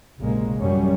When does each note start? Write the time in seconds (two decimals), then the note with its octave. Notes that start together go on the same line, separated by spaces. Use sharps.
0.19 F1 A#1 C#3 G#3 A#3
0.59 A1 F#2 F#3 G3 C#4